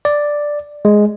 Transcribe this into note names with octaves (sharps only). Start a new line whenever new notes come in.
D5
G#3